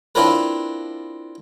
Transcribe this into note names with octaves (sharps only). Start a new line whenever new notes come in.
C4 D4 E4 F4 A#4 B4